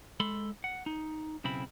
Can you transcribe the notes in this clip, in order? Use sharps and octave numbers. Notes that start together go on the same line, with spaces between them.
G#3 A4 B5 C6
F#5
D#4
B1 C#3 C4 E4 B5